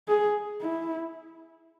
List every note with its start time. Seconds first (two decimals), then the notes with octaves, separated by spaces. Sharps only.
0.08 G#4
0.62 E4